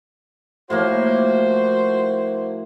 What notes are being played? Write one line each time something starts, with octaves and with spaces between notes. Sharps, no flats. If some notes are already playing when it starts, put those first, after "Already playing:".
A2 F3 A#3 F#4 C5